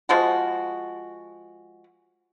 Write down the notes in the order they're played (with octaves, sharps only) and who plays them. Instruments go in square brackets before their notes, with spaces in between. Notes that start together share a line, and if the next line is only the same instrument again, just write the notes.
[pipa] F3 G#3 F#4